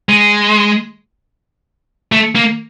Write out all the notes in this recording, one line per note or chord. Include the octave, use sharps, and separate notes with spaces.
G#3
A3
A#3